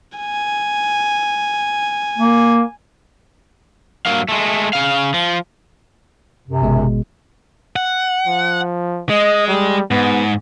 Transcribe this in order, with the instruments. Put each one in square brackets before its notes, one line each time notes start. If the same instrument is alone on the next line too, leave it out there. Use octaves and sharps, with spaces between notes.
[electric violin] G#5
[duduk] A#3
[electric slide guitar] G2 F#3 A#3 F5
G#3 A3
C#3 F5
F3
[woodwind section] F#2 C3
[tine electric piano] G#1 B2 G#3
[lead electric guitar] F#5
[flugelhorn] F3
[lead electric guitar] G#3 [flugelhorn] D#5
[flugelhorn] G3
[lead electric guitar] G#2 [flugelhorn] B3